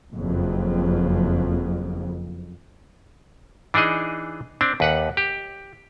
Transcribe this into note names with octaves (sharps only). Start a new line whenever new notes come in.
F#1 F2
E3 D4 D#4 G#4 D#5
C4 D4
D#2 B4 F#5
G4